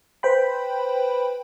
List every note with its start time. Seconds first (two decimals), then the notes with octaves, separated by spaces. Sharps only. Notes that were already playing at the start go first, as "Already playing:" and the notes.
0.23 B4 C5 G5 B5